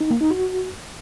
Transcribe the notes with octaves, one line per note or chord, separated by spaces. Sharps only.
D#4
A#3
D#4
F#4